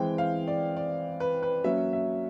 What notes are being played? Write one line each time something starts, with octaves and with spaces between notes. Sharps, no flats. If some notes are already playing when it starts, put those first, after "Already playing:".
Already playing: E3 G#3 C4 E4 G5
F5
D5
D5
B4
B4
F#3 A#3 C#4 E5
E5